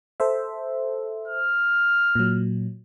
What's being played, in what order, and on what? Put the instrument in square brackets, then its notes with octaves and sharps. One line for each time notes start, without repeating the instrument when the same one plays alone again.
[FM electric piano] A4 C5 E5
[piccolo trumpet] F6
[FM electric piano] A#2 F#3